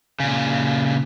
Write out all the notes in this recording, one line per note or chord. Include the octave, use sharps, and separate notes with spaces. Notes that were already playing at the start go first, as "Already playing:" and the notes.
A#2 C#3